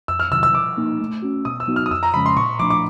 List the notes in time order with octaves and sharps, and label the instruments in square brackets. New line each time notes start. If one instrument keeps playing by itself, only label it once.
[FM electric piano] F2 [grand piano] E6
[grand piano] F6
[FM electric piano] C3 D#3 F#3 [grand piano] E6
[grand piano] E6
[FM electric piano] F3 [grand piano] D6
[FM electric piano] A#3 D#4
A3
C#4 F#4
[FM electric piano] B2 [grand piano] D#6
[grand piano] E6
[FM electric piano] F#3 B3 D#4 F#4
[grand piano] F6
D#6
[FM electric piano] F2 [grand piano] E6
[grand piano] A#5
[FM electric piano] C#3 F3 G#3 C#4 [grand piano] B5
[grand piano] C6
[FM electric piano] A#2 [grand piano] C#6
[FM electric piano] F3 A3 D4 [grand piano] D6
[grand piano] D6